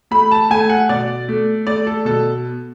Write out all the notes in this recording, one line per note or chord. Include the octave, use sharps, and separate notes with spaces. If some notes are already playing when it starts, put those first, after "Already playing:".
A3 B5
A5
A3 G#5
F#5
B2 D5
A3
A3 D5
A4
B2 A4